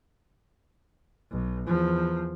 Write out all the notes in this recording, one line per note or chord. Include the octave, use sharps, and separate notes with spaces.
B1
E2 F3